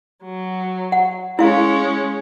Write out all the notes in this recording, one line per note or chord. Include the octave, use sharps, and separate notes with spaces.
F#3
F#5
G#3 C#4 E4 F5